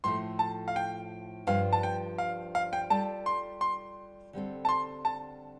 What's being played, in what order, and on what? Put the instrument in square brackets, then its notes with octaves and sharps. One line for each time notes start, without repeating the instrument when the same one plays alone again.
[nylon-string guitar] A2 F3 A3 [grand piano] C6
[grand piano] A5
F5
G5
[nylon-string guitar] G2 F3 D4 [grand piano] F5
[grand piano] A5
G5
F5
F5
G5
[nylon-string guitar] G3 F4 A4 D5 [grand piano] A5
[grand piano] C6
C6
[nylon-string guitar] D3 G3 C4 A4
[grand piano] A5
C6
A5